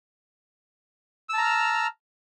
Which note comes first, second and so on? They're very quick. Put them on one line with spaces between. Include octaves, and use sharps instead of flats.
E6 A5 A#5 F6